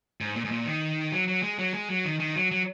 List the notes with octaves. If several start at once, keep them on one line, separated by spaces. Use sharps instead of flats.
G#2
A#2
G#2
A#2
D#3
F#3
F#3
G#3
F#3
G#3
F#3
D#3
D#3
F#3
F#3